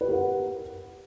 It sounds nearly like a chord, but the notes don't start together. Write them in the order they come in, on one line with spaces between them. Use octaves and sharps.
B4 G4 A#4 F#5